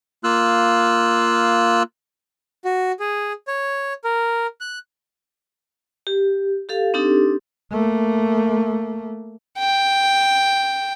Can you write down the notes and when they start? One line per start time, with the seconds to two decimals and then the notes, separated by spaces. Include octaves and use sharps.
0.24 A#3 F4 E6 F#6
2.65 F#4
3.00 G#4
3.48 C#5
4.04 A#4
4.61 F#6
6.07 G4
6.69 G4 A4 F5
6.94 C4 D4 D#4 G4 A4
7.71 A3 A#3
9.59 G5